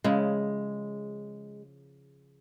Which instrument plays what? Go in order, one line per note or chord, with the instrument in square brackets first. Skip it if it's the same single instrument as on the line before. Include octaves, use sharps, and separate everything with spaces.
[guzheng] C#3 F3 E4 [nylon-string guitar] G#3